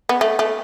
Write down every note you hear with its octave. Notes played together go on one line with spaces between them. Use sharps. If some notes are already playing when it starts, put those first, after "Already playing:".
B3
A3
A3